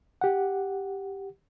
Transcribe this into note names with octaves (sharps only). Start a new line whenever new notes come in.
G4 F#5